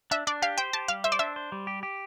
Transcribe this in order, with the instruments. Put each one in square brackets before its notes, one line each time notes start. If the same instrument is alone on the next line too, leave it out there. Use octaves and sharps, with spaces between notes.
[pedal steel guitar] D4 [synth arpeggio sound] E5
[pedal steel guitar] D4 [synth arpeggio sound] D5
[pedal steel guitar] G4 [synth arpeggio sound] F5
[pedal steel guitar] C5 [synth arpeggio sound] G5
[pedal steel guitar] G4 [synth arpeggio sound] A5
[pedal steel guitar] G3 [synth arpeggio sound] F5
[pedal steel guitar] C5 [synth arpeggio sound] E5
[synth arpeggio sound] D5
[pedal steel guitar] D4 [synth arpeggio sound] E5
[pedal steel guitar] C5
G3
G4
G4